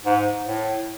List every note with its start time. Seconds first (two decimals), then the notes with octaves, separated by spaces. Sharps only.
0.06 G#2
0.47 A2